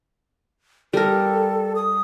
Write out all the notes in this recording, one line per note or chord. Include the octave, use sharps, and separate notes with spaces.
G3 A4 A#4
D#6